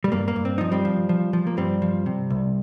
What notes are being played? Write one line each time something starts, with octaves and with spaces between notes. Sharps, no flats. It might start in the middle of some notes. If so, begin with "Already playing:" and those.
G3
G2 A#3
A#3
G2
C4
F3 D#4
G3 C4
F3
F3
F3
A#3
G2 G3 C4
F3
C3
C2